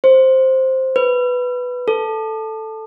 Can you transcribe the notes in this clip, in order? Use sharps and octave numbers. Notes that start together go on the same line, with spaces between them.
C5
B4
A4